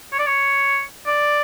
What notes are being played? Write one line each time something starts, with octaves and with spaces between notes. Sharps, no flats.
C#5
D5
C#5
D5